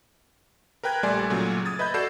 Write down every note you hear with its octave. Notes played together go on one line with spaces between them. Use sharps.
A#4 B4 G5 F#6 G#6
A#1 G3 A3 D5 G#5 C6
A#2 C#3 F#3 A3
D#6 G#6 A6
B4 D#5 E5 B5 G6
F#4 A4 D5 G6 C7 E7